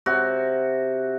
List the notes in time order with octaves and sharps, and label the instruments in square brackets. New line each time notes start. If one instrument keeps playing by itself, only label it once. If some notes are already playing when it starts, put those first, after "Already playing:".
[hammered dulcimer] C3 F#4